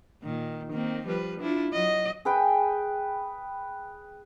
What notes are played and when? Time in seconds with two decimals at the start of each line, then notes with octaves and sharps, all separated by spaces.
0.22 A#2 D#3
0.72 D#3 A#3 C4
1.05 F3 G3 B4
1.40 D4 E4 F4
1.72 F#3 D#5
2.25 G#4 B4 G5